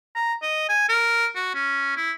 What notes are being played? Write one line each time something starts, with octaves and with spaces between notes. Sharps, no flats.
A#5
D#5
G#5
A#4
F#4
C#4
E4